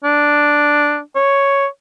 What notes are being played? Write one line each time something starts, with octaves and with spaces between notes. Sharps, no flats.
D4
C#5